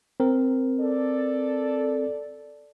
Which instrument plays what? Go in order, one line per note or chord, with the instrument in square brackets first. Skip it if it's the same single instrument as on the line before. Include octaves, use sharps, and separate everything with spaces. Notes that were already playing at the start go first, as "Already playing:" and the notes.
[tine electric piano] C4 A#4
[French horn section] A4 D5